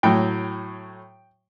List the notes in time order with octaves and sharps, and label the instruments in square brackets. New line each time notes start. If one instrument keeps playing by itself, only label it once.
[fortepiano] A2 F#3 G5